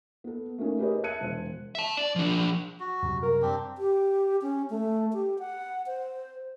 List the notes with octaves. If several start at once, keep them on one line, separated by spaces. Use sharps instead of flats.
B3 A4
A3 A#3 C#4 D#4
G4 G#4 A#4 B4 C#5 D#5
E5 A5 F#6 G#6 C#7 D#7
E1 C5
E5 A5
D5
F3 D4
F#4
F#2 C3 G3
A#4
C4 D4 G4
G4
C#4
A3
G4
F#5
C5